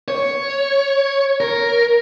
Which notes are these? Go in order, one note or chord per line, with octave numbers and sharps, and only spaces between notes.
C#5
A#4